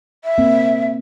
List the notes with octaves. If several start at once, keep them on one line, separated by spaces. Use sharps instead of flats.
E5
A#3 C4